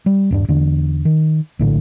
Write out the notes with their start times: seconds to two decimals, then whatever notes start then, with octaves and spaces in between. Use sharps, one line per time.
0.06 G3
0.31 D#1 G2 D4
0.48 E2 D3
1.05 D#3
1.59 A#1 A2 D3